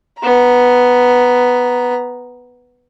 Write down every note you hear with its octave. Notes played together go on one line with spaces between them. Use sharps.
B3 A#5